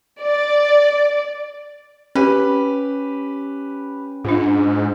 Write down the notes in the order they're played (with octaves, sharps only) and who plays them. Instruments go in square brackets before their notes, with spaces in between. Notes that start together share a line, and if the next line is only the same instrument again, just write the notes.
[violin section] D5
[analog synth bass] C#4 [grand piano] G4 B4
[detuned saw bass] G#2 [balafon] D4 F4